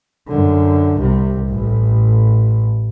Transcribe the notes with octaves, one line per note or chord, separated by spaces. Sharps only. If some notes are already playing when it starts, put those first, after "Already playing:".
F#2 D3
C2 C3
A1 A2